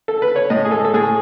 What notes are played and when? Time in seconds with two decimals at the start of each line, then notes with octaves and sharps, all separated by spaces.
0.08 A4
0.22 B4
0.36 C#5
0.50 A2 D#5
0.65 G#4
0.71 G#3 A4
0.85 A4
0.94 A2 G#4